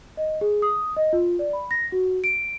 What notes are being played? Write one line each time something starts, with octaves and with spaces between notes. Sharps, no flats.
D#5
G#4
D#6
D#5
F4
D5
B5
A#6
F#4
D7